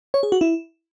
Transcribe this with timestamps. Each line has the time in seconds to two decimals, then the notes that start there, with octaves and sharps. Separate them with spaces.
0.14 C#5
0.23 G#4
0.32 F#4
0.41 E4